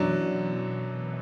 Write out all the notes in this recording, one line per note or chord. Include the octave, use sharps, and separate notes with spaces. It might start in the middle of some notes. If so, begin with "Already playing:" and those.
Already playing: F#2 B2 E3 F#3 D4
B2 E3